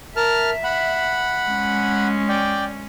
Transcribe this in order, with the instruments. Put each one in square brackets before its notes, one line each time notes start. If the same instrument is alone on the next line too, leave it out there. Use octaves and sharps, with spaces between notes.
[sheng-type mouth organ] A#4 A5 F6 [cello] E5
[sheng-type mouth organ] F#5 B5
[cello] G#3 C#4
[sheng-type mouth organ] D5 G5